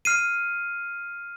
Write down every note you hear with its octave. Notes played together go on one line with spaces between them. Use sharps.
F6 C7 D#7